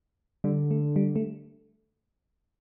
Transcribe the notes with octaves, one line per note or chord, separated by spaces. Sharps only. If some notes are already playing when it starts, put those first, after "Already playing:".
D3 G3
A3
G3
A3